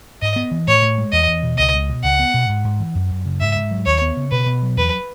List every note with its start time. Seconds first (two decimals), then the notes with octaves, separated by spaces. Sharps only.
0.22 G#2 D#5
0.36 B3
0.51 E3
0.67 A2 C#5
0.82 A2
0.98 G#3
1.12 E2 D#5
1.28 E2
1.43 B2
1.58 C#2 D#5
1.73 C#2
1.89 B2
2.03 C#2 F#5
2.19 B3
2.34 B2
2.49 G#2
2.64 G#2
2.79 E3
2.95 F#2
3.11 F#2
3.25 C#3
3.40 G#2 E5
3.56 G#2
3.71 F#3
3.86 D#2 C#5
4.01 B3
4.17 C#3
4.31 B2 B4
4.46 B2
4.62 F#3
4.77 E2 B4